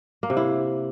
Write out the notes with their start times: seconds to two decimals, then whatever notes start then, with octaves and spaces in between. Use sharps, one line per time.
0.23 A#3
0.30 C3
0.37 E4